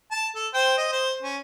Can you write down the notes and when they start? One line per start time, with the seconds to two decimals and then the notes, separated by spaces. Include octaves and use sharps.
0.11 A5
0.35 A4
0.54 C5 G5
0.78 D#5
0.92 C5
1.22 C#4